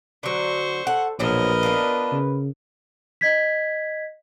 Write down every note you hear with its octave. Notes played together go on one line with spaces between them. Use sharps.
D3 F#3 C5 C#6
A4 F#5
A#1 B2 F3 F#3 A#4 B4 D#5
B3 D4 F4
C#3
D#5 G#6 B6